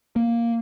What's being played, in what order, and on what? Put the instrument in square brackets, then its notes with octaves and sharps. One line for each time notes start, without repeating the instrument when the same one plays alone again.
[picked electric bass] A#3